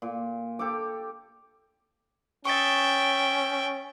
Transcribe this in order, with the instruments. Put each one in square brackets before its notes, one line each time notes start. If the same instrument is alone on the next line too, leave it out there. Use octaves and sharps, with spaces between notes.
[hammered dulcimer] A#2
G4 A4 D6
[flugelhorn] C#4 [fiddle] E5 G5 [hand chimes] C#6 D#6 A6